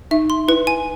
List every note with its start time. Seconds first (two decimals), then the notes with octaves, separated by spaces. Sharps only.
0.11 D#4 E5
0.30 C6
0.48 E4 B4
0.67 G#5